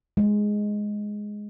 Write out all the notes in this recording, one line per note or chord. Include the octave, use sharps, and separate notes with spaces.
G#3